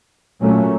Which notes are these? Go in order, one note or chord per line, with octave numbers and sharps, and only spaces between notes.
A#2 F#3 A3 C#4